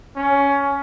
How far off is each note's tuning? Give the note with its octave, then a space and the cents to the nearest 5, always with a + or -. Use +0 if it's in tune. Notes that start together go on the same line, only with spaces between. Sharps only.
C#4 +15